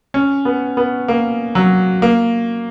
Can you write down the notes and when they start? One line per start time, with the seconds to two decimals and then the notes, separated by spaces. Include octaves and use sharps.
0.14 C#4
0.45 B3
0.77 B3
1.08 A#3
1.55 F#3
2.02 A#3